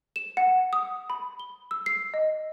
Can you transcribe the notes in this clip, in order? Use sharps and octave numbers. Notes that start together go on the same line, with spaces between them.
E7
F#5
D#6
B5
G7
E6
C7
D#5